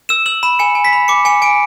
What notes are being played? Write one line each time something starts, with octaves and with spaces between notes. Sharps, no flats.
E6 E7
E6 F#7
B5 E7
G#5 C#7
G#5
B6
B5
D6 C#7
G#5 C#7
G#5 D7